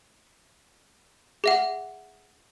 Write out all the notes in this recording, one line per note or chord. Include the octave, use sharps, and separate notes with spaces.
G#4 E5 F#5